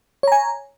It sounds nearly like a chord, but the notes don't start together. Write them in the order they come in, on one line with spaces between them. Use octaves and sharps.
C#5 A#5 G#5